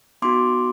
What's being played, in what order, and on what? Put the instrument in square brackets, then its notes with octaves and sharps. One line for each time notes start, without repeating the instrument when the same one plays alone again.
[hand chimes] B3 D#4 F#4 C6 D6